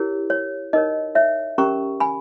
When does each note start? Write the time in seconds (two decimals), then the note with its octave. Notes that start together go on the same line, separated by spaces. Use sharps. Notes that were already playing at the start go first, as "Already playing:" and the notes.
Already playing: E4 G4 A#4 C#5
0.30 C#5
0.73 D#4 A#4 C#5 D#5
1.15 C#5 E5
1.58 C#4 G4 A#4 A#5 C#6
2.00 G#5 B5